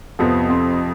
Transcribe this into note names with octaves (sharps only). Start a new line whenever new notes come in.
F2 C3 F3 B3
C4